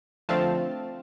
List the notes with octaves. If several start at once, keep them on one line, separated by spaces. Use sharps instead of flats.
D3 F3 A3 C4 F5 A5